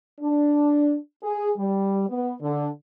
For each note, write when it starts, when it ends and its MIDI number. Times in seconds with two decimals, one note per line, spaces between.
0.21 0.95 62
1.23 1.50 68
1.57 2.09 55
2.09 2.34 59
2.42 2.68 50